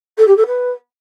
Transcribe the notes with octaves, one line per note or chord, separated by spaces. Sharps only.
A4
G4
A4
B4